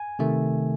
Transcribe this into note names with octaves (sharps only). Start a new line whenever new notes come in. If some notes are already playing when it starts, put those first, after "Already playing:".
Already playing: G#5
C3 D#3 A3